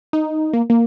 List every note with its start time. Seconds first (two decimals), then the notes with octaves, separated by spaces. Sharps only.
0.13 D#4
0.53 A#3
0.70 A#3